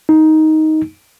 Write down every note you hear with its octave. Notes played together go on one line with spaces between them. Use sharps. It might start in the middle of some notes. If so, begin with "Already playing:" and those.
D#4